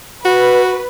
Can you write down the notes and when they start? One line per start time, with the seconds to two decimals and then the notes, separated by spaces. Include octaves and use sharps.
0.25 F#4 B4